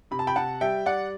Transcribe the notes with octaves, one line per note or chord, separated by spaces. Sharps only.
C3 B5
A5
G5 B5
C3 F#5 A5
G3 E5 G5
G3 D5 F#5